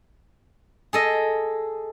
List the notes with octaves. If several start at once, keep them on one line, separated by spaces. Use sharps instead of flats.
G#4 A4 D#5